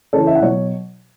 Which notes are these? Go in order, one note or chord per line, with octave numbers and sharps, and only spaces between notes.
C#3 E3 A4 C#5
E5
F#5
B2 F#3 C#5